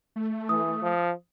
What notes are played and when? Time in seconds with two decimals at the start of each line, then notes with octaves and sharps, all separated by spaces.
0.16 A3
0.49 E3 D#6
0.82 F3